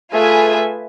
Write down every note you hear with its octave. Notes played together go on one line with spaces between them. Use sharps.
A3 F4 G#4 B4 E5 G#5